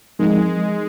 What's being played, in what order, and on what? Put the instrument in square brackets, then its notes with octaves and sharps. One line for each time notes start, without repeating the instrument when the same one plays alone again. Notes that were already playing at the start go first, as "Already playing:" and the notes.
[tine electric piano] F3 C4 D#4 A#4 [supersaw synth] G#3